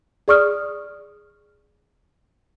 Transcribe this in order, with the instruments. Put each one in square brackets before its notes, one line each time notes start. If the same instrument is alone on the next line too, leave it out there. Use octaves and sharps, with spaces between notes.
[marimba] G#4 D5 C#6 D#6 F6